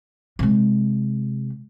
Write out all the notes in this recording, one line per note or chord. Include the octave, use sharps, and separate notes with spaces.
C3 G#3